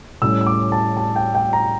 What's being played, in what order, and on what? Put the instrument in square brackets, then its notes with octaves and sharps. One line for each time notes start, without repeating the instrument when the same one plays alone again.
[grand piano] A2 G3 C#4 E6
E6
D6
A5
A5
G5
G5
A#5